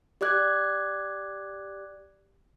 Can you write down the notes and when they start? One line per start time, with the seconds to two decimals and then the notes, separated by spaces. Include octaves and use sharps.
0.21 G4 D5 D6 F#6 G#6